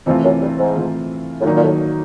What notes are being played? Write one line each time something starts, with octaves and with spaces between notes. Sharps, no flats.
F2 C3 E3 A3 C4 F4
F#2
G2
G#2
C3 E3 A3 C4 F4
A2
A#2 D#3 F#3 A#3 D#4
A#2
A2